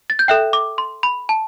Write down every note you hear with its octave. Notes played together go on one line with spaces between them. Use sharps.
A6
G6
A4 E5 G5 F#6
D6
C6
B5
A5